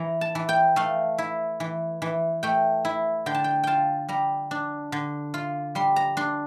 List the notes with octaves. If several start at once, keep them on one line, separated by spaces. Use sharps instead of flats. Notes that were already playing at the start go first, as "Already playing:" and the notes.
Already playing: E3 A#5
A5
E3
G5
A3 F5
E4
E3
E3
A3 G5
E4
D3 G5
A5
G5
F4 G5 A5
G3 A#5
D4
D3
F4
G3 C6
A#5
D4 C6